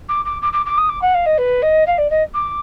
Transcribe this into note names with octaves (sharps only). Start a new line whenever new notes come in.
D6
D6
D6
D6
D6
D#6
D6
F#5
F5
D#5
B4
D#5
F5
D5
D#5
D6